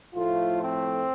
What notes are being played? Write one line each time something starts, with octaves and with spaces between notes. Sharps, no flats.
A2 F3 A3 F4
C4